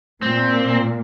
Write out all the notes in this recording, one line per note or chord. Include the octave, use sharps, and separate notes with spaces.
A#2 C4